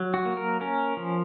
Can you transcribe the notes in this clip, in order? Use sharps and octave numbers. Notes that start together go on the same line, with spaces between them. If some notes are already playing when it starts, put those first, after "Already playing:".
Already playing: F#3
F#4
A#3
A#4
C#4 A#4
F3